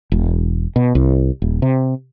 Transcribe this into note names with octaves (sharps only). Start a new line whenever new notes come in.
E1
B2
C2
D#1
C3